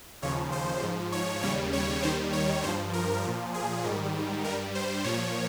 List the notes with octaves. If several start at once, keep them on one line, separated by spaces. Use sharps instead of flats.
D#2 C#3 F3 C#5
C5
G#2 F3
C#5
D#2 C#3 G3 C#5
C#5
D#2 D#3 G3 C5
C#5
G2 F3 C5
A#4
A#2 F3
G#4
G#2 D#3 G3
G2 G3 A#4
C5
A#2 F3 C#5